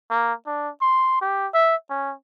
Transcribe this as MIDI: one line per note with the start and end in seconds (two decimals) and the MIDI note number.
0.10 0.33 58
0.46 0.69 62
0.81 1.16 84
1.21 1.47 67
1.54 1.75 76
1.90 2.13 61